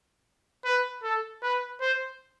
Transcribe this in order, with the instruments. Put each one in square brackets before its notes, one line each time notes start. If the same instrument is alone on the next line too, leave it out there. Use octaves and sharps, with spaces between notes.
[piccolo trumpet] B4
A4
B4
C5